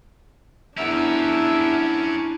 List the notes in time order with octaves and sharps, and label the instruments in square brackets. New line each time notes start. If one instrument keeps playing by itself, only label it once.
[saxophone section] E2 B3 E5 [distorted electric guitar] C#4 A#4 [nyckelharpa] D4 E4